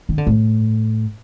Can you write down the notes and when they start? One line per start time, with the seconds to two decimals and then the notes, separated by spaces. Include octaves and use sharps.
0.09 D#3
0.18 D3
0.27 A2